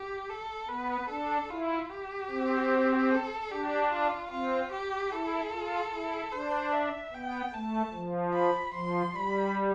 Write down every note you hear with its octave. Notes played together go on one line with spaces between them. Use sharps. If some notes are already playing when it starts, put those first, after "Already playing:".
Already playing: G4
A4
B3 B4
D4 A4
E4 F4
G4
C4
A4
D4 G4
F4
C4 F4
G4
E4 A4
F4
E4
D4 C5
E5
B3 G5
A3 A5
F3
B5
F3 C6
G3 B5